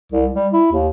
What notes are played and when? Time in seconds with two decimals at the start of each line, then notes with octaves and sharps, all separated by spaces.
0.12 C2
0.34 G3
0.53 E4
0.72 D#2